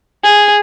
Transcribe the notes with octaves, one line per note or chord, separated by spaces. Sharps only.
G#4